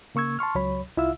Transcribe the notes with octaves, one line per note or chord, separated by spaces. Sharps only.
C#3 A#3 C#6 E6 G#6
A5 C6 C#6 F6
C#2 F#3 C#5 B5
C2 E4 F4 E5 F5 E6